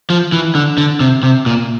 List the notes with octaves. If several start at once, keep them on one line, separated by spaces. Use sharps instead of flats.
F3
E3
D3
D3
C3
C3
A#2